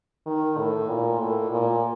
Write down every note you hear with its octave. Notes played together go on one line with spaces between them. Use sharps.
D#3
A2
A#2
A2
A#2